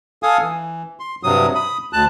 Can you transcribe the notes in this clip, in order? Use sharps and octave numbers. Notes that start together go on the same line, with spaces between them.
A4 F5 G#5 D#6
E3
C6
G2 C3 F#3 D#6
B5 D#6
D2 A5 F#6